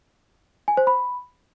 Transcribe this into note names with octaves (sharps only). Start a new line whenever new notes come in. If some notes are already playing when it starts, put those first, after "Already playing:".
G#5
C5
B5